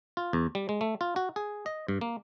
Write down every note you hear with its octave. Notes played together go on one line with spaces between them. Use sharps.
F4
E2
G3
G#3
A3
F4
F#4
G#4
D#5
G2
A#3